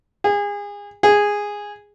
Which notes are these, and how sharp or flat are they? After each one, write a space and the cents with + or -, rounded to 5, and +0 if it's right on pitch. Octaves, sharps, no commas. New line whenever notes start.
G#4 -30
G#4 -10